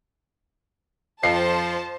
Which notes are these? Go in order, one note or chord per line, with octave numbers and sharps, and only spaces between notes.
F2 F3 C5 A5 C7